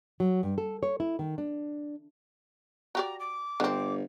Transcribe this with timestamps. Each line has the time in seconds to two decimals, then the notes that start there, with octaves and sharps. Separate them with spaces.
0.20 F#3
0.43 G2
0.58 A4
0.83 C#5
1.00 E4
1.19 D#3
1.38 D4
2.95 F#4 G4 D5 A#5
3.20 D6
3.60 G1 D3 C4